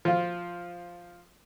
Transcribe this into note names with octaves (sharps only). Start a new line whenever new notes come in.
F3 F4